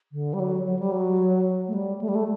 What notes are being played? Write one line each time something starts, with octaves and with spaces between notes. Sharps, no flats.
D3
G3
F#3
F#3
G3
F#3
A3
G3
A3
G3
A3